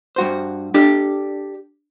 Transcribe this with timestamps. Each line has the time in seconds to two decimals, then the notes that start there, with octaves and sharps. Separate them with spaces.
0.16 G2 F#4 C5
0.74 D4 G4 A4 D5